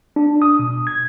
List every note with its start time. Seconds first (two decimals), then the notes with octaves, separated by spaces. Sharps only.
0.16 D4
0.42 D#6
0.59 B2
0.87 G#6